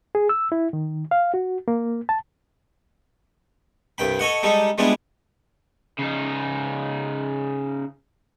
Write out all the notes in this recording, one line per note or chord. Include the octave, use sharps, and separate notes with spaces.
G#4
E6
E4
D#3
F5
F#4
A#3
A5
C2 G2 G5 B5
A4 C#5 D#5 F#5
G3 G#3 D#4 A4
G3 G#3 B3 D4 E4 F4
C#3 D#4